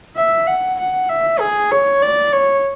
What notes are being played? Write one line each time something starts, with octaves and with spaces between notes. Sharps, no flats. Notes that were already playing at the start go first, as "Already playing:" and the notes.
E5
F#5
F#5
E5
G#4
C#5
D5
C#5